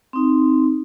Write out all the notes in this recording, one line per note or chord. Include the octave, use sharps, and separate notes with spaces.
C4 D#4